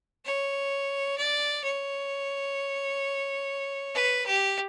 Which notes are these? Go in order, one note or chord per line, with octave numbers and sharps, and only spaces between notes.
C#5
D5
C#5
B4
G4